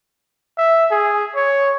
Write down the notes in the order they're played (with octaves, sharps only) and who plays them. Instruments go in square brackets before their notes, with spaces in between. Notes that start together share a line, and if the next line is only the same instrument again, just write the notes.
[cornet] E5
G#4
C#5